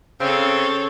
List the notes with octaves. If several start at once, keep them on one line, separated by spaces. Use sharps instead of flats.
C#3 C4 A4 C#5